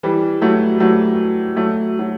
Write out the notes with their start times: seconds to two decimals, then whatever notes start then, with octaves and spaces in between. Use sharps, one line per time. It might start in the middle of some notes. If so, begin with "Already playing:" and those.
0.03 E3 G3
0.42 F#3 A3
0.80 F#3 A3
1.57 F#3 A3
1.99 F#3